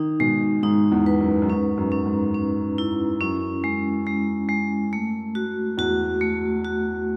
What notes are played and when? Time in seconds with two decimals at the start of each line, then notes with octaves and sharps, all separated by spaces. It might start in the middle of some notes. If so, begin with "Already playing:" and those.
Already playing: D#3 D#4
0.20 B2 G#3
0.63 G#2 D#4
0.92 E2
1.06 B4
1.20 F#2
1.42 F#2
1.49 G#2 C#4
1.77 F#2
1.92 C#4
2.06 G#2
2.35 C#4
2.78 E4
3.21 F#2 C#4
3.64 G#3
4.07 G#3
4.49 G#3
4.93 A3
5.35 F#4
5.78 E2 F#4
6.21 A3
6.65 F#4